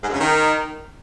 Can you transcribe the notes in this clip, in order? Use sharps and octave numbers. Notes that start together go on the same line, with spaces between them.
G#2
F#2
C#3
D#3